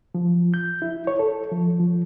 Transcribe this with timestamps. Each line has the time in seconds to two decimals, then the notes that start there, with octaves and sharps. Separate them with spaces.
0.15 F3
0.54 G6
0.82 E4
1.07 C#5
1.19 A4
1.52 F3
1.80 F3